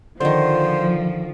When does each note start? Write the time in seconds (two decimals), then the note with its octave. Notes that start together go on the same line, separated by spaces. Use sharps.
0.21 D3 D#3 F3 C5